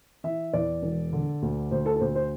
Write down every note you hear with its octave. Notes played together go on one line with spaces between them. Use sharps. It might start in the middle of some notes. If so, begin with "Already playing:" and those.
E3 E5
E2 D5
E1
D3
D2
D2 C5
A4
A4
D2 C5
C5